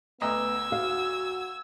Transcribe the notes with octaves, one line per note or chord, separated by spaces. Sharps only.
D2 B3 D#5 A#5 E6 G#6
F#4 F5